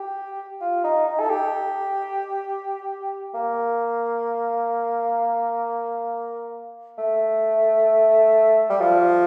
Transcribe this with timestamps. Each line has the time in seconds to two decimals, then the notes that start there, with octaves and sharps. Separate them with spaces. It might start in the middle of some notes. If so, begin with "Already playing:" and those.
Already playing: G4
0.61 F4
0.84 D#4
1.07 D#4
1.20 A4
1.30 G4
3.34 A#3
6.98 A3
8.69 G3
8.81 F3